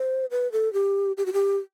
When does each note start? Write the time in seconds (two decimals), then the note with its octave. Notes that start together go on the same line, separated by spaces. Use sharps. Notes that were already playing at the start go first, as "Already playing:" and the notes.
Already playing: C5
0.31 B4
0.52 A4
0.73 G4
1.18 G4
1.26 F#4
1.33 G4